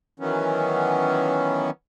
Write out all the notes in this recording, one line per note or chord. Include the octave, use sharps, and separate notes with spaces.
D#3 E3 F#3 B3 C#4